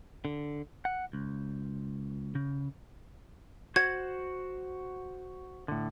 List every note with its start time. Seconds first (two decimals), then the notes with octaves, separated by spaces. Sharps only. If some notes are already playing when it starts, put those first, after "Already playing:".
0.25 D3
0.85 F#5
1.13 C#2
2.35 C#3
3.76 F#4 C5 F#5 G#6
5.68 A2 D3